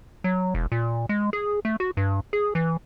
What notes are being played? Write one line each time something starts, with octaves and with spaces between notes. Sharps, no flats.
F#3
E1
A#2
G#3
G#4
A3
F#4
G2
G#4
E3